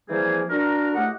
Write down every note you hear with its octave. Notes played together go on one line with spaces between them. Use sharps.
E3 F3 G3 A#3 C4 G#4
D4 F#4 A#4
A2 A3 G4 D#5 F#5